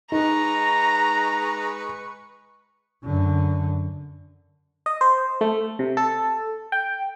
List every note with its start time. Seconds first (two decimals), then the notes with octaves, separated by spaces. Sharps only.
0.12 G#3 D#4 B4 A#5 C#6
3.04 F#2 D3
4.86 D#5
5.01 C5
5.41 A3
5.79 C3
5.97 A4
6.72 G5